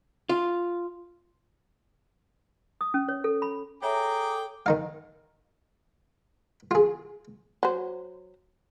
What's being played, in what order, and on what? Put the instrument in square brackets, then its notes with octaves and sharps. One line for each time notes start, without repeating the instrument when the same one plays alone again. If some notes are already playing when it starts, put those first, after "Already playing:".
[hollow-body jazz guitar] F4
[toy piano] D#6
C#4
C#5
A4
B5
[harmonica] G#4 G5 D6 [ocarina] A4 [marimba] C#5 E5 [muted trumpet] A#5
[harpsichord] D#3 D#4 F5
F4 G#4
[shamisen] F#3 C5